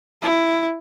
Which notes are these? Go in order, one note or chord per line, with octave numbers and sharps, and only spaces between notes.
E4